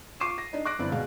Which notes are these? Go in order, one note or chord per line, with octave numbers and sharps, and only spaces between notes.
F4 C#6 D6 C7 D#7 E7
A#6
D4 D#4
D6 F#6 A#6 D7
G1 C4 E4 D5
B2 G#3 F5